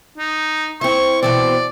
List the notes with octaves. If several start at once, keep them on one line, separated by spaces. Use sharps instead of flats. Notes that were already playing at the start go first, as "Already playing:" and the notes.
D#4
C4 E4 C#6
B2 E3 C4 D5